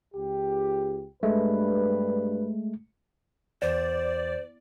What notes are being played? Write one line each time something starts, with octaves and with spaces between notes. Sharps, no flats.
C#2 G4
G2 G#3 A3 B4
E2 C5 D5